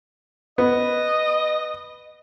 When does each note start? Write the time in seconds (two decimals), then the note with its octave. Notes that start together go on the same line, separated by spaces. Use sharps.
0.58 B3 D#5